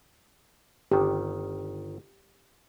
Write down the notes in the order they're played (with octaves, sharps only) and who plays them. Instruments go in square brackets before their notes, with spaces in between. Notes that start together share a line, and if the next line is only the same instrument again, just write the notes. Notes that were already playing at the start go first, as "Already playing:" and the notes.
[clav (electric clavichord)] G1 D#3 [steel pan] G4